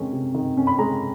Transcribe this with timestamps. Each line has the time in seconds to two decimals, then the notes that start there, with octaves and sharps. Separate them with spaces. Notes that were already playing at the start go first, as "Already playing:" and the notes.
Already playing: C3 D#3 G#3 C#4
0.13 C3
0.35 D#3
0.57 C#4
0.67 B5
0.78 G#3 A#5